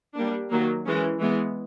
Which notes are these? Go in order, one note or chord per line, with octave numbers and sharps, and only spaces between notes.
G3 A#3 D4
D#3 F#3 A#3
E3 G#3 C#4
E3 G#3 B3